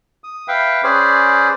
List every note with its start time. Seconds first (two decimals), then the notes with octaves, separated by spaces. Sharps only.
0.24 D#6
0.48 B4 E5 F5 G5
0.84 C#4 G#4 B4 C5 D5